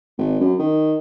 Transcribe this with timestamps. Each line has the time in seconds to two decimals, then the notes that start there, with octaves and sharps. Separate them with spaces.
0.18 G#1
0.40 F#2
0.59 D#3